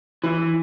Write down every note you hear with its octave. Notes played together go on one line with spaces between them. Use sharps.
E3